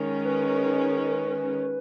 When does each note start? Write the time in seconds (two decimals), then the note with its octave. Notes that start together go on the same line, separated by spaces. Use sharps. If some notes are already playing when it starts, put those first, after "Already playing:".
Already playing: D#3 G#3 C#4
0.25 B4